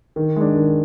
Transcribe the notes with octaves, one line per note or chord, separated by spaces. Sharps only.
D#3
G#3 D4
D#3